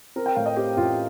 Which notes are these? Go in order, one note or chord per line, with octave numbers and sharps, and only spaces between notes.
C4 A#4
G5
A2 F5
D#5
C4 G4
A1 F4